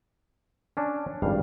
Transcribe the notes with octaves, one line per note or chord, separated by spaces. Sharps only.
C#4 D4
G#1 C#2 G2 G3 F5